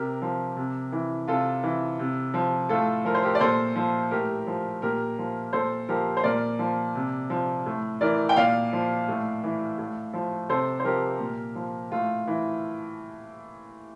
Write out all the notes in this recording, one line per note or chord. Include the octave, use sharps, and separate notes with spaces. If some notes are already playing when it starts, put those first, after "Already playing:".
Already playing: C3 G4 A#4
F3
C3
E3
C3 F4 A4
E3
C3
F3
A2 F4 A4
F3 A#4
C5
G4 A#4
D5
A#2 A4 C5
F3
A2 G4 A#4
F3
A#2 G4 A#4
F3
A#2 A4 C5
F3 G4 A#4
C5
A#2 A#4 D5
F3
C3
F3
A2
E3 A#4 D5
G5
A#2 D5 F5
F3
A2
E3
A2
F3
C3 A4 C5
C5
F3 G4 A#4
A#2
F3
A2 F4
E3